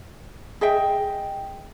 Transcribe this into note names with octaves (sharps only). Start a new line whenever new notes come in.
G#4 D#5 E5 G5